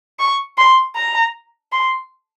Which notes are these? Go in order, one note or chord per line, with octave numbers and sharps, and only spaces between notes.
C#6
C6
A#5
C6